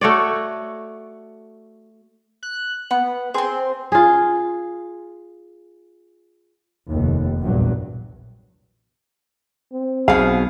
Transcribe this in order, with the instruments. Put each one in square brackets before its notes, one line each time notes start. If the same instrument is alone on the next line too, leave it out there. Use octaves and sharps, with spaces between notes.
[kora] A3 F#4 C#5 D5
[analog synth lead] F#6
[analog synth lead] B3 [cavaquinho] F#5
[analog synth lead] C4 [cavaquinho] G#4 C6
[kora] F4 G#4
[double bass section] F1 D#2
A#1 E2 G2 F#3
[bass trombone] C4
[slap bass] B1 [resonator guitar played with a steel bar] B2 G#4 [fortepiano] F5